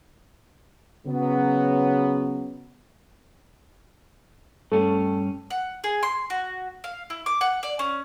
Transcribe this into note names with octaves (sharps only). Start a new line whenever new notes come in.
C#3 F#3 B3
G2 A3 C#4
F#5
G#4
C6
F#4
F5
E4
D6
F#5
D5
C#4